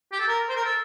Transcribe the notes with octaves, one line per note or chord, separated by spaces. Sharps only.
G4
A4
A#4
C5
A#4
A4